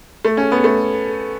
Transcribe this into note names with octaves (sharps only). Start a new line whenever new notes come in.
A3
C#4
B3
A3